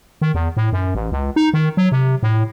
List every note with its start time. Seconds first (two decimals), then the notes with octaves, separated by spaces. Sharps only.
0.22 D#3
0.34 E2
0.57 A2
0.73 F#2
0.95 A1
1.12 C#2
1.36 D#4
1.54 D#3
1.77 F#3
1.92 C3
2.23 A2